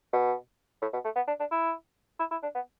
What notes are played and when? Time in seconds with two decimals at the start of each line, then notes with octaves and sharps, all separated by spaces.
0.13 B2
0.82 A2
0.93 B2
1.04 A3
1.16 B3
1.28 D4
1.40 D4
1.52 E4
2.19 E4
2.31 E4
2.43 D4
2.55 B3